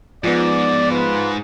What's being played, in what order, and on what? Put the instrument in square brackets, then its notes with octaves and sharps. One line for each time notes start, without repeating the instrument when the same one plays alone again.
[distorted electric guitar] G#2 [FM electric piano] F3 B3 [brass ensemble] D5
[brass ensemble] F4 B4